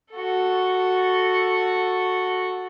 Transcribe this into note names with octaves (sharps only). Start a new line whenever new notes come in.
F#4 A4